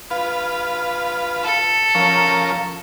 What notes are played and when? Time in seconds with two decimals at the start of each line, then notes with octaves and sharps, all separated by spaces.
0.11 F4 B4
1.44 A4
1.95 F3 C#4 A#4